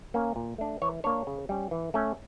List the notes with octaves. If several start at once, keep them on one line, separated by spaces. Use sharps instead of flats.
A#3 C#4
A#2
A3 D4
E3 C#5
A#3 D4 C#5
C#3
G3 C#4
E3
A3 C#4